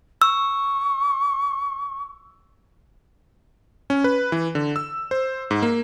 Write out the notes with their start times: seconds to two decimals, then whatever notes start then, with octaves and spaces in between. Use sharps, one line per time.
0.22 C#6 E6
3.90 C#4
4.04 B4
4.32 E3
4.55 D3
4.76 E6
5.11 C5
5.51 G#2
5.62 A#3